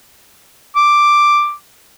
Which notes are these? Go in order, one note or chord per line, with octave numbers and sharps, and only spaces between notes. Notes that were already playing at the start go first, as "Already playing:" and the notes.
D6